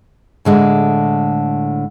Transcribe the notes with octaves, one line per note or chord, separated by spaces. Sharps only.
A2 D3 G#3